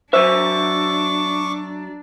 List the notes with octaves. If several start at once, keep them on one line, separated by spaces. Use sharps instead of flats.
F#3 D4 C5 E5 C#6 D6